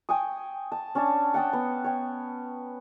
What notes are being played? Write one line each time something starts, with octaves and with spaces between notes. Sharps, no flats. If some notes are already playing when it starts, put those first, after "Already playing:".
G5 G#5 C#6 D#6
A5
C#4 D4 C#5 A5
F#5 G5 A5 D#6
B3
C#5 G5